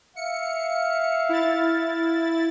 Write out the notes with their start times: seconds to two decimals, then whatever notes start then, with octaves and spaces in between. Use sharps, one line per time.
0.16 E5 F5 C#7
1.29 E4 A6